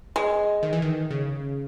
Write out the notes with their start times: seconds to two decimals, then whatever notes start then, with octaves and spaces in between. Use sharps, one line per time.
0.16 G#3
0.63 D#3
0.73 E3
0.82 D#3
1.10 C#3